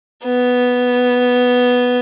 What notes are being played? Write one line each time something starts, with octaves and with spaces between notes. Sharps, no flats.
B3